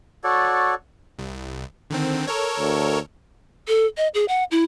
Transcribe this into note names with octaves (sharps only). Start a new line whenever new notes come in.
F#4 A4 C#5 D5
C2
D3 D#3 C4
A4 A#4 C#5
D2
A4
D#5
G#4
F#5
E4